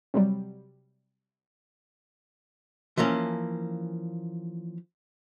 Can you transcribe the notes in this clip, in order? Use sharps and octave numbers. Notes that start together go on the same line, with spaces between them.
C3 F#3 G3
E3 F3 A#3 C#4